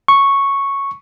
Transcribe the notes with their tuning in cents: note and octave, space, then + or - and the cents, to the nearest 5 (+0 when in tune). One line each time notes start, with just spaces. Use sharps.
C#6 -5